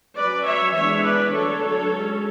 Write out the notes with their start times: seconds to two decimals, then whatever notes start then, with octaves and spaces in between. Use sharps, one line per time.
0.16 F#3 C#4 B4 D5
0.45 C#5 E5
0.75 E3 G#3 B3 D4 C#5 E5
1.04 B4 D5
1.33 D3 F#3 A3 D4 A4 C#5
1.93 G#3 C#4